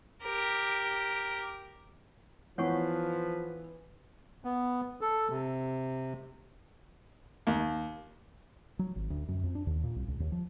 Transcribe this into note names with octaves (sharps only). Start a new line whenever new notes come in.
G4 A#4
E3 F3 B3 B4 C#5 F#5 C#6
B3
A4
C3
D#2
F#3
G#1
D2
F#2
F2
D4
D#2
A#2
C2
C#2
D#2
F3